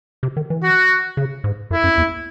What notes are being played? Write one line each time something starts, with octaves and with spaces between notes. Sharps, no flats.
C3
D#3
E3
F#4
C#3
G#2
F#2 E4
F#2
E2